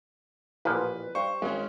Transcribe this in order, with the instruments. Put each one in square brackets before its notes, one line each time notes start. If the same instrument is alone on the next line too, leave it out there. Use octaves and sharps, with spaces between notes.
[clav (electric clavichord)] A1 A#2 F3 [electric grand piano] B4
[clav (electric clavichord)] G2 [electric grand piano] C5 C#6
[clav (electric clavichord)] G#1 [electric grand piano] G#3 C#4